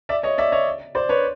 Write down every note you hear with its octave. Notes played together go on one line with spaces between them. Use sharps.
D5 E5
C#5 D#5
D5 E5
C#5 D#5
C5 D5
B4 C#5